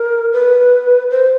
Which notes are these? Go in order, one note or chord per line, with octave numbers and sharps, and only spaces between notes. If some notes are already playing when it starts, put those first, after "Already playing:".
Already playing: A#4
B4
C5